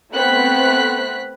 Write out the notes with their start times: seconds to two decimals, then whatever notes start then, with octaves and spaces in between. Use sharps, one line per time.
0.13 A3 B3 C4 F#6 B6